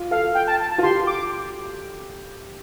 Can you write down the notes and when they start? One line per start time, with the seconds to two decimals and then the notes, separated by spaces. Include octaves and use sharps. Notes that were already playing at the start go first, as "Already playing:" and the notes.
Already playing: F4
0.11 A4 F5
0.35 G5
0.47 A5
0.60 A5
0.71 A5
0.78 F4
0.83 G4 C6
1.07 D6